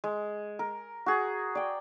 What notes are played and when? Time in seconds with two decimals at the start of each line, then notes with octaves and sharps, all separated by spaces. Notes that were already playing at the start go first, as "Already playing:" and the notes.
0.04 G#3
0.59 A#4
1.06 F#4 G#4
1.55 D5 G5